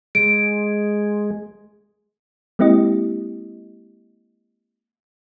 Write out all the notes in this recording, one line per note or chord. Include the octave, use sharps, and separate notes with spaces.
G#3 D7
G#3 A#3 C4 E4 G4 D#5